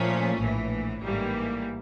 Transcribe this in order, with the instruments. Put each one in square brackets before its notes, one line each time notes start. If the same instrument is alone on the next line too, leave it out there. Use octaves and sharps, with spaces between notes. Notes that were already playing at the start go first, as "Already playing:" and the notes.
Already playing: [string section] A#2 F3 A3 C#4
A#1 A2 E3
A1 G#2 E3 G3 A#3